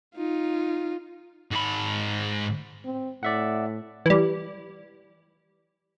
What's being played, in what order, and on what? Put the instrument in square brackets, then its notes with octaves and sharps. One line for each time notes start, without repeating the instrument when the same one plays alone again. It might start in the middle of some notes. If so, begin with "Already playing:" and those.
[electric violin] D#4 F4
[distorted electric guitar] G#2 B5
[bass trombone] C4
[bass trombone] A2 [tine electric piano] D5 E5 F#5
[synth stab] E3 G3